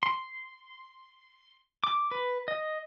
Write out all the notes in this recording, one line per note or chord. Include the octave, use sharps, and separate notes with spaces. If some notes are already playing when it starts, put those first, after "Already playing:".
C6
D6
B4
D#5